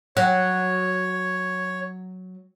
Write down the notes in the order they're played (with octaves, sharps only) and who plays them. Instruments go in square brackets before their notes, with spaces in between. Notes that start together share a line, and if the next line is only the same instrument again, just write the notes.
[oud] F#3 [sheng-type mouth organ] C#5 [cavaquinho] F#5